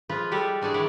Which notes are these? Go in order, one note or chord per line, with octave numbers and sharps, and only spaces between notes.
F3 G#3 F4 B4
G3 G#3 G4 A4
E3 D4 F#4 G#4 D5
D#3 F#3 G#3 E4 D5 F#5